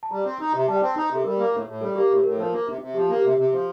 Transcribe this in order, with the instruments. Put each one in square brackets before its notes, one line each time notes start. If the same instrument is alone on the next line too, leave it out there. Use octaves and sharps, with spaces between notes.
[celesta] A5
[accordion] G3 [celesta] A#5
[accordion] C4
D#4
C3
[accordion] G3 [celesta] A5
[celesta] G5
[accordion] C4 [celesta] A5
[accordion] D#4
C3
[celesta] A4
[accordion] G3 [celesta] A#4
[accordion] A#3
A2
A2
[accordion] G3 [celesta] A4
[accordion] A#3 [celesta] G4
[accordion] A2 [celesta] G4
[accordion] A2 [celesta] A#4
[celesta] A4
[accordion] F3 [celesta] A#4
[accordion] A#3
C3
C3
[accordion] F3 [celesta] G4
[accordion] A#3
[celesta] G4
[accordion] C3
C3
F3